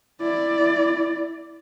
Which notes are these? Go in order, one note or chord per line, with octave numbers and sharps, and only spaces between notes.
E4 D5